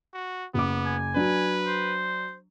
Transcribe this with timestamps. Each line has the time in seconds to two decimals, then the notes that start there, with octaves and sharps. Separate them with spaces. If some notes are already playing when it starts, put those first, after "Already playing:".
0.14 F#4
0.54 F#1 B3 D6
0.86 G#5
1.16 F#3 D4 B4
1.67 C5